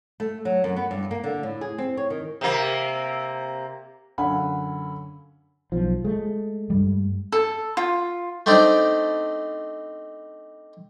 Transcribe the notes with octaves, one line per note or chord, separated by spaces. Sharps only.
A3
F#3
F#2
B3
G2
A#3
D3
A2
G#4
C4
C#5
D#3
C3 A#3
F#2 D3 F5 F#5 G#5 B5
B1 F3
G#3 A3
G2 G3
A4
F4
A3 C4 D4 D#4 C5 D5